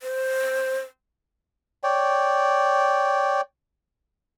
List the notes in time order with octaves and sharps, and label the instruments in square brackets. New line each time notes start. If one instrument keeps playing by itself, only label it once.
[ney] C5
[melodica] C#5 D5 G5